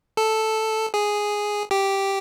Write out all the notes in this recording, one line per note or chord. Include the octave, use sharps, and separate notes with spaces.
A4
G#4
G4